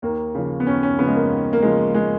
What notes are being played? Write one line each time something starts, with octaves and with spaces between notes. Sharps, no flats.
D#2 A#3
C#3 F3
B3
D#2 C#4
C#4
C#3 F3 B3
G#3
A#3
D#2
A#3
C#3 F3 G#3
G#3